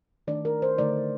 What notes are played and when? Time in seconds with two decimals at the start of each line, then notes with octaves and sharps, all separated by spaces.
0.27 D#3 A3 D4 D5
0.45 A#4
0.62 C5
0.78 D3 A3 D#4 D5